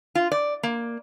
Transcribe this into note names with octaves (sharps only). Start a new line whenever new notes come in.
F4
D5
A#3